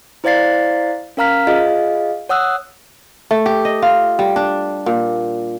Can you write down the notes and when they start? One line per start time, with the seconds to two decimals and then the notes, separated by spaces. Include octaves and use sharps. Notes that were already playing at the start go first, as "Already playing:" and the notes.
0.24 E4 C5 D5 F5 A6 C7
1.17 C#4 A#4 F5 A#5 F6 B6
1.47 F4 G#4 D#5 F5
2.29 C#5 F#5 D#6 E6 F#6
3.31 A3
3.46 G4
3.65 D#5
3.82 F4
4.19 G3
4.36 D4
4.86 A#2